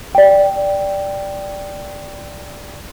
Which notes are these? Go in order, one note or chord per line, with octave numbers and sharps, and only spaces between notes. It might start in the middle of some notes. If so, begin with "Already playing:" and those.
D5 G5